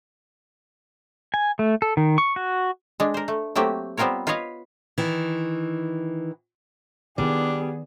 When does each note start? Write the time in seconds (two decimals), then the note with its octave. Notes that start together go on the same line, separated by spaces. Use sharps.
1.34 G#5
1.59 A3
1.82 A4
1.97 D#3
2.18 C#6
2.36 F#4
3.00 G#3 D4
3.14 A#4 C5
3.28 A3
3.55 F#3 A3 A#3 C4 G4
3.97 G3 B3 C4 F4 A#4 C#5
4.27 F4 B4 C#5 D#5 F5
4.98 D#3 E3
7.18 D#3 G3 B3 D4 E4 G#4